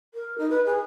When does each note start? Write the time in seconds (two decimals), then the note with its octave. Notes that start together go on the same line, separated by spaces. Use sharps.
0.14 A#4
0.38 D#4
0.50 B4
0.65 G#4